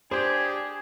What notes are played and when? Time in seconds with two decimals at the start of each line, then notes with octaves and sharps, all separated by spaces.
0.11 D4 G4 G#4 C5 G#5